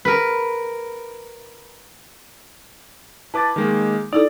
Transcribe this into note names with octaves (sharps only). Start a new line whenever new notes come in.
A#4 B4
E4 B4 A5 D6 A6
D#3 G#3 A#3
D#4 E4 A4 D5